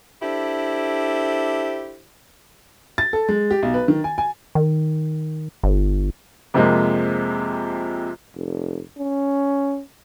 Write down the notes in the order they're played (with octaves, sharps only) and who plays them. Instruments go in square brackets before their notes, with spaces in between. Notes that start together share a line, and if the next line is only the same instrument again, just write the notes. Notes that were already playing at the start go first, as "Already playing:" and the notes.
[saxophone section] D4 E4 G4 A4 C5
[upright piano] A6
A4
G#3
G4
B1
B4
D#3
G#5
G#5
[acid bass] D#3
G1
[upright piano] F2 C3 F3 G#3 A#3
[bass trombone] F1
C#4